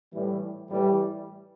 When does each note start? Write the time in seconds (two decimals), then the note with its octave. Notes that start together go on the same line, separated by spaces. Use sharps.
0.13 A2 E3 G3
0.69 A2 E3 G3